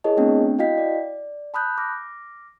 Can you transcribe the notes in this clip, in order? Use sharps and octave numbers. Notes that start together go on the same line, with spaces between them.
E4 G#4 A#4 C#5 D#5 A5
A3 B3 C4 D4 G5
E4 F#4 D#5 F5 G5 B6
D5
A5 B5 D#6 F#6 G6
D6 F6 A#6